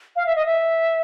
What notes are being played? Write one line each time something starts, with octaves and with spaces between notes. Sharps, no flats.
F5
E5
D#5
E5